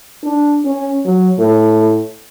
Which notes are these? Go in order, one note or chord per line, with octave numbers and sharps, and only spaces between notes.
D4
C#4
F#3
A2